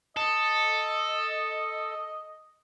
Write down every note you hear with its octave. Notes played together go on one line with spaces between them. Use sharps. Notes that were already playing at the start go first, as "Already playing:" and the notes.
A4 D#5